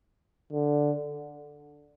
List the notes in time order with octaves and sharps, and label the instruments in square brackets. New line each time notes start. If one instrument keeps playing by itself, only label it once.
[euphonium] D3